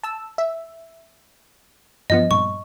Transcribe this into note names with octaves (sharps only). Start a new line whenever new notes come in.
A5 E6
E5
G2 F3 B3 D#5
G2 A#2 C#6